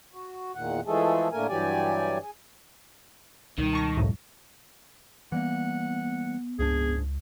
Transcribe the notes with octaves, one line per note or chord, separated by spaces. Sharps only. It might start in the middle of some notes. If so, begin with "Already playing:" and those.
F#4
E2 A#2 D#3 F#5
E3 F3 G#3 A3 G#4 A4
A2 D3 A3 A#3 A#4 G#5
G2 E3 F#3 G4 D5 G#5
G#4
C#2 B2 D#3 G3
A5 C#6 A#6
C2 F2 A2
E3 G3 A#3 B3 F#5
F#1 C#2 G#2 D4 G#4